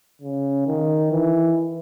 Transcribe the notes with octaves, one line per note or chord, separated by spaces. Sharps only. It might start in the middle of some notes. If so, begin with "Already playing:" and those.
C#3
D#3
E3